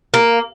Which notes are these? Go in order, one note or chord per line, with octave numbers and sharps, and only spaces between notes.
A#3